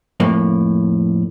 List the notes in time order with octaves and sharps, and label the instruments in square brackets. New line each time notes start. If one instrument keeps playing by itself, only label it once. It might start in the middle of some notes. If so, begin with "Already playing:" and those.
[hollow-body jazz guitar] F2 A2 A#3